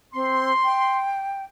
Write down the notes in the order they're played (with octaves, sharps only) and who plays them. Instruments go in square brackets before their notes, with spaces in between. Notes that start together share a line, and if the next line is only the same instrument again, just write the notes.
[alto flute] C4 [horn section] C6
[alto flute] G5